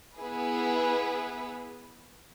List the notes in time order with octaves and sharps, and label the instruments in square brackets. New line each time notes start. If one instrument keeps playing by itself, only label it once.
[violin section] B3 E4 G#4 B4